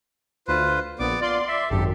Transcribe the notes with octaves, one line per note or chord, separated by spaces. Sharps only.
D2 F4 B4 C5
A#1 B3 D5 D6
F4 D5 C6
E5
G#1 F#2 G4 A4